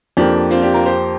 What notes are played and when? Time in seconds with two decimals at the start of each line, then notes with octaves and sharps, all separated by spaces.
0.17 F2 F3 A#3 D4 G4
0.51 C4 F4
0.63 D4 G4
0.74 F4 A#4
0.85 G4 C5